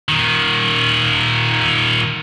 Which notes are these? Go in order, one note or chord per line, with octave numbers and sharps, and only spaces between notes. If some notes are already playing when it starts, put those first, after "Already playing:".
A#2 D#3